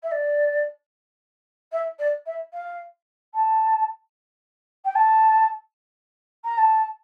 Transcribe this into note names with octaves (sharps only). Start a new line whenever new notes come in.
E5
D5
E5
D5
E5
F5
A5
G5
A5
A#5
A5